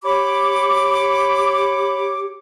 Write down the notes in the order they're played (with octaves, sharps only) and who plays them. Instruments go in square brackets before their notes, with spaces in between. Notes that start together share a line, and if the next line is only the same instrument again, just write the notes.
[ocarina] G4 [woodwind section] C#5 D6 [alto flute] B5